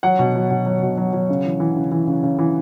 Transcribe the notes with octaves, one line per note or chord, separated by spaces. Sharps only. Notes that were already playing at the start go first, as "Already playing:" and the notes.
F#3 F#5
B2
F#3
B2
F#3
B2
F#3
F#3
C#3
E3
E3
C#3
E3
C#3
C#3
E3